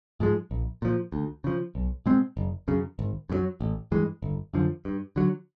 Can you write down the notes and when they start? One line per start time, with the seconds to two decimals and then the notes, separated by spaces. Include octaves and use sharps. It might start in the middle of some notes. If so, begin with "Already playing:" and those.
0.20 G#2 F3 G#3
0.51 A#1
0.82 A#2 F3
1.12 D2
1.44 C#3 F3
1.75 B1
2.06 B2 G#3 C4
2.37 F#1
2.68 F#2 C#3
2.99 G#1
3.30 F#2 C#3 F#3
3.61 A1
3.92 G2 E3 G#3
4.22 G1
4.54 F#2 D3 F3
4.85 G2
5.16 D3 F#3